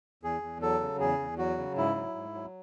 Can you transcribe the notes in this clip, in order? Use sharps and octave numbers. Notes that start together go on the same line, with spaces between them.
E2 G#4
E2
F#3 A4
C#3
E2 G#4
E2
F#3 F#4
C#3
G#2 E4
F#3
G#2
F#3